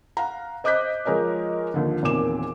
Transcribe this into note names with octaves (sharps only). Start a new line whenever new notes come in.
F5 F#5 A#5
C5 D#5 D6 F#6 G6 B6
F3 G#3 A#4 C#5 D#5
D#2 D3 F3
E1 A#2 D#3 C4 D6 E7